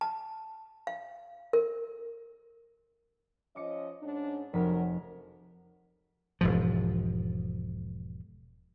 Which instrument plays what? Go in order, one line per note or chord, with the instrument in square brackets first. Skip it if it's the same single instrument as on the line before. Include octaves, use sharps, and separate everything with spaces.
[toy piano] A5
F5
A#4
[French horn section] F3 C#4 D#5 [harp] D6 C#7
[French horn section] G#2 C#4 D4
[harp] F1 B6 [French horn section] F#3 A#4
[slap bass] E1 G#2 F3